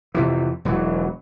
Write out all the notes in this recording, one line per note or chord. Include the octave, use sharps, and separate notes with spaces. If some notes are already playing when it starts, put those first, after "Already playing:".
F2 C3 E3
E1 E3 F#3